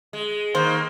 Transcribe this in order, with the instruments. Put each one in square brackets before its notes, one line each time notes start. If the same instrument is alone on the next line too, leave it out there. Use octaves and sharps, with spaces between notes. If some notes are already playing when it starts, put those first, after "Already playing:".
[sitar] G#3
[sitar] D#3 A#3 [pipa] C5